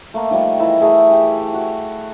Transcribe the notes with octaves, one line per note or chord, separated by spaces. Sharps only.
A3 A#3
D#3 F3 G3 A3
E3 E4 A#4 A5
A3 G#4
G4
F#4